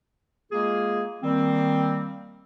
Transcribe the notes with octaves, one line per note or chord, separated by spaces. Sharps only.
G#3 A#3 F4 G#4
D#3 G3 A#3 C4